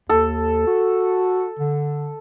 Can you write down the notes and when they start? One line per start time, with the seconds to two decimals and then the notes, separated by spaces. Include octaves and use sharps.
0.09 D#2 A4
0.67 F#4
1.59 D3